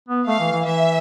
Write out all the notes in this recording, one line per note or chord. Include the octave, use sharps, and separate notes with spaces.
B3
A3 F5
E3
E3
E3 E5